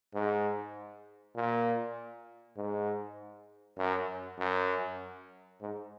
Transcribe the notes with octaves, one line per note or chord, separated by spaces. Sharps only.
G#2
A#2
G#2
F#2
F#2
G#2